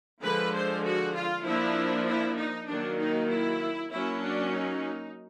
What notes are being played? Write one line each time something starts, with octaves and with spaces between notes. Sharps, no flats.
D3 F3 G#3 B4
C5
F#4
F4
F3 A#3 D4 E4
E4
D#4
D#3 F#3 A#3 D4
D#4
E4
F#3 A#3 C#4 E4
D4
D#4